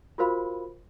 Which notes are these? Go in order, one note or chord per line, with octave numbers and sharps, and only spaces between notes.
F4 F#4 A#4 C5 F5 B5